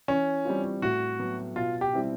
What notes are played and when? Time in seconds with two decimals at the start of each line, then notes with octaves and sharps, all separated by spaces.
0.08 E3 C#4
0.45 G3 C4 F4
0.82 A2 F#4
1.19 F#3 B3
1.56 B2 F4
1.81 G4
1.93 G3 C4 E4